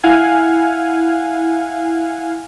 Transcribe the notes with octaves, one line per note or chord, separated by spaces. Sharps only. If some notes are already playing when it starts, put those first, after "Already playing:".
E4 F5 F#5 G#5